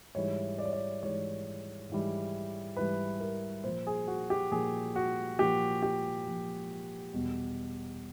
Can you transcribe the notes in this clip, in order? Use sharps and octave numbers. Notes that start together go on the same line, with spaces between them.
G#2 E3 G3 C#5
D5
C#5
D5
G#2 E3 G3 C#5
G#2 E3 G3
G#2 E3 G3 B4
A#4
A#2 F3 C5
G#4
F#4
G4
A#2 F3 G#4
F#4
A#2 F3 G4
G4
A#2 F3
E2 B2 G3